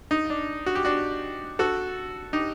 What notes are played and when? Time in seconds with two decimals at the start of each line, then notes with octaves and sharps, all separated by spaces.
0.11 D#4
0.30 D4
0.66 F#4
0.75 G4
0.85 D4 F#4
1.59 F#4 A4
2.33 D#4 G4